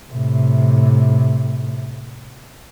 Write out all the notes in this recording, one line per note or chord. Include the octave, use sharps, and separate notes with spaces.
A2 C3